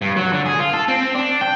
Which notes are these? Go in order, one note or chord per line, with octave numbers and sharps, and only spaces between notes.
G2
F#3
D3
G#4
F4
A4
C4
D4
G5